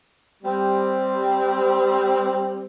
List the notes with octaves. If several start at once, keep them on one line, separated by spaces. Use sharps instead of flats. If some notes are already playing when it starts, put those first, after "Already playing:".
G3 C4